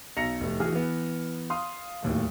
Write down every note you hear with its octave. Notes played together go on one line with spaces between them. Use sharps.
B1 A#5 A#6 C#7 F7
F1 A2
E3 F#4 G#4 F6
E3 B3
F5 C6 D#6
D1 D#2 A2